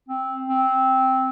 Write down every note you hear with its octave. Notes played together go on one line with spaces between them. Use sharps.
C4
C4